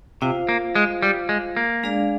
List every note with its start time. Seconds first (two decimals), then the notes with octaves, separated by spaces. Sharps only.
0.21 C3 F4 C5 F5
0.49 A#3
0.75 G#3
1.02 G3
1.29 G#3
1.57 A#3
1.83 G#3 D4 G#4 D5 F5